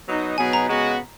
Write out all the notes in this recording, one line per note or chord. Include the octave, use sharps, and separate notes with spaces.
F#3 B3 D#4
B2 F#3 B3 D#4 G#4 G#5
A#5
C#3 G#3 B3 F#4